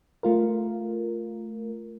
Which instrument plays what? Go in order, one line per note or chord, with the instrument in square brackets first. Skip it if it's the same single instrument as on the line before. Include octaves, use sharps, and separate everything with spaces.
[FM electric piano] A3 F4 A#4